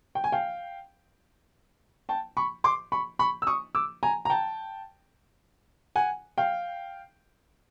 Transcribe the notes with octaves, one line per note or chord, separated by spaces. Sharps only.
G5
G#5
F5 G5
G5 A5
B5 C#6
C6 D6
B5 C#6
B5 C#6
E6
C#6 D#6
D6 E6
G#5 A#5
A#5
G5 A5
F#5 G#5
F5 G5